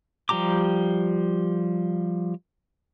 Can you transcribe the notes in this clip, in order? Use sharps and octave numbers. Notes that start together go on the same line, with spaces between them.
F3 G3 G4 A#5 D6